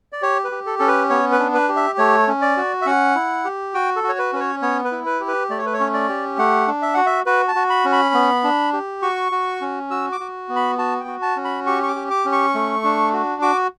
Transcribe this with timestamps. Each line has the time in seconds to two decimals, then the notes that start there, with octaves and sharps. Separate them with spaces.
0.12 D5
0.22 G4 C#5
0.44 B4
0.52 G4
0.66 A4
0.79 C#4 A4
0.88 B4
1.10 B3 C#5
1.32 B4
1.39 D4
1.54 B4
1.69 G4
1.76 E5
1.98 A3 C#5
2.28 C#4
2.42 D5
2.57 F#4
2.82 E5
2.86 C#4 F#5
3.16 E4
3.45 G4
3.74 F#4 G5
3.96 A4
4.04 F#4
4.09 C#5
4.19 B4
4.33 C#4 B4
4.40 C#5
4.62 B3 C#5
4.84 B4
4.92 E4
5.06 B4
5.20 G4
5.28 B4
5.50 A3 D5
5.58 C#5
5.66 B4
5.73 C#5
5.80 C#4
5.94 D5
6.09 G4
6.38 A3 F#5
6.68 D4
6.82 E5
6.94 F#4 F#5
7.06 E5
7.26 F#4 B4
7.48 A5
7.55 F#4
7.70 B5
7.85 C#4
7.93 B5
8.14 B3
8.44 D4
8.73 G4
9.02 F#4 C#6
9.32 F#4
9.61 C#4
9.90 F#4 E6
10.12 D6
10.20 F#4
10.49 B3
10.56 B5
10.78 F#4 A5
11.00 G5
11.08 F#4
11.22 A5
11.37 C#4
11.44 B5
11.67 G4 C#6
11.83 C#6
11.88 D6
11.96 G4
12.11 D6
12.25 C#4
12.32 C#6
12.55 A3
12.84 D4
13.13 F#4
13.42 F#4 D6